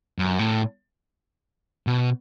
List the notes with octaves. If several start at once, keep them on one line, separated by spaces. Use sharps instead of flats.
F#2
A2
B2